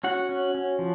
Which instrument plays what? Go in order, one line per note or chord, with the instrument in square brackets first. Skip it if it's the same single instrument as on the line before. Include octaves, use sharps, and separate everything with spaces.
[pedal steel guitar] C#4 F#4 F#5
C#4
C#4
F3